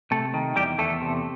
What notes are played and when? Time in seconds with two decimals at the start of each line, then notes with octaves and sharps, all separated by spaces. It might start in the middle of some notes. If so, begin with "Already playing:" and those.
0.11 C3 A3 A4
0.34 D#3
0.56 E2 G3 G4
0.79 E2 A3 A4
1.01 C3